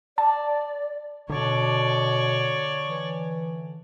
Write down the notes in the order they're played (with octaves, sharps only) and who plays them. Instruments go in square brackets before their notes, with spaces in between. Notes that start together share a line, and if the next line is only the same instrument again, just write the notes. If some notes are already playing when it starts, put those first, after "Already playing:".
[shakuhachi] D5 [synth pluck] A5
[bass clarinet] B2 [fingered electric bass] D3 [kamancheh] C#5 D5
[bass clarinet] E3